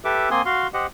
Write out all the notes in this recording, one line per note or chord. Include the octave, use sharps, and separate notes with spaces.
G4 A4 B4 E5 D6
A#3 C4 G#5 C6 D#6
F#4 F5 C6
G4 C5 D#5 F#5